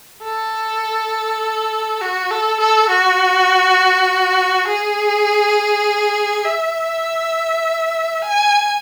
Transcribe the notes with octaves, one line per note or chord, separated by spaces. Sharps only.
A4
F#4
A4
A4
F#4
G#4
E5
G#5